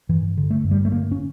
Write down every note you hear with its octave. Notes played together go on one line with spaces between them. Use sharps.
G2 E3
D3
A3
G2
G3
A3
D3 A#3
C#4